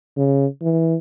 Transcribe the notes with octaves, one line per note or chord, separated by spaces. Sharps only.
C#3
E3